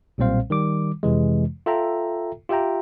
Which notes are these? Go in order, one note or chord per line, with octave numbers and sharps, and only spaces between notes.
B1 A#2 G3 C4 C5 F5
D#3 G3 D6
F2 C3 E3 G#3
F4 A4 E5 G5 A#5
F4 G4 E5 G5 A#5